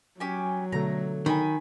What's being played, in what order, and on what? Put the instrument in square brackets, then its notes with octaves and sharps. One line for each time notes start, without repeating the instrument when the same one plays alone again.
[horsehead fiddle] F#3 [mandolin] C#4 G4 G#5
[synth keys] B2 D3 A3 [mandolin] A#5
[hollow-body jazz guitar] D#3 [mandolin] G#5 B5